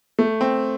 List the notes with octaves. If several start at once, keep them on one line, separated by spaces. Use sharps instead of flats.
A3
C4